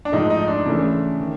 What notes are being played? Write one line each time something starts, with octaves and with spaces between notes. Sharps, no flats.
D4
G#2 F3 A3 D#4
D#4
D4
C#3 E3 A3
D#3